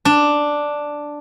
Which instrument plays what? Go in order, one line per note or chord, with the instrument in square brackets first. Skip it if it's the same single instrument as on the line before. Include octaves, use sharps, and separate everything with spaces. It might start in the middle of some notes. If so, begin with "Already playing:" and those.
[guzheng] D4